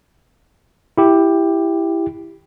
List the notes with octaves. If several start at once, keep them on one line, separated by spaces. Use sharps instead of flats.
E4 G4